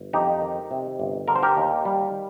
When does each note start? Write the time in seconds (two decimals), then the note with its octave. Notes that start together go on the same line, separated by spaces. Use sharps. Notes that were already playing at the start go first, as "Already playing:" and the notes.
Already playing: G1
0.13 F2 D#4 G4
0.42 D#3
0.71 C3
1.00 G1
1.28 D3 A#4
1.35 C5
1.43 G4 A#4
1.57 D#2
1.85 G3